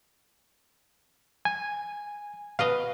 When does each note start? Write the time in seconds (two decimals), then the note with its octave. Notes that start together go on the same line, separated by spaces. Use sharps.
1.45 G#5
2.59 B2 B4 D#5 F5